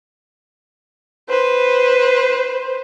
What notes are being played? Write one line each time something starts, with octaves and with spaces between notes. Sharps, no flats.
B4 C5